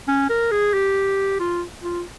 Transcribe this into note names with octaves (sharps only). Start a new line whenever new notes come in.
C#4
A#4
G#4
G4
F4
F4